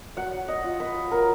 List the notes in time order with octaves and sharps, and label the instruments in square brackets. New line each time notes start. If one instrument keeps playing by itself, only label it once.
[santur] F#3 F#5
D#5
F4
B4
F#3 A#4